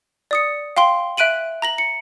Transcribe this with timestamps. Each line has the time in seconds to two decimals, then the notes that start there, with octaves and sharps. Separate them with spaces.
0.31 D5 D#6 C#7
0.77 F5 G5 C6 G7
1.17 E5 F#6 D7 D#7 F#7
1.62 A#5 A#6 F#7
1.78 C#7